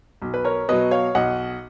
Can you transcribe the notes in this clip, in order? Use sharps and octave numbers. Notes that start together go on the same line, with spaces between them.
B1
B4
A#4 C#5
B2 F#3 B4 D#5
C#5 F5
B1 D#5 F#5